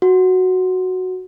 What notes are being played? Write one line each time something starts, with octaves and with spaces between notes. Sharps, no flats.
F#4